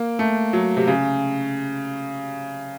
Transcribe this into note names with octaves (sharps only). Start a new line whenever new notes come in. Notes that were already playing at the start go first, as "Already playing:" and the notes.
Already playing: A#3
A3
F#3
C3
C#3